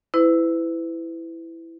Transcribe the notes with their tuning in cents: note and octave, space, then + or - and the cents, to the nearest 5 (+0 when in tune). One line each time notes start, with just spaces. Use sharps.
E4 +5 B4 +35